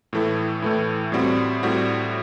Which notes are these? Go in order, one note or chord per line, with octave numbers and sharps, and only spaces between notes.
A2 E3 A3 E4
A2 E3 A3 E4
A2 G3 C4 F#4
A2 G3 C4 F#4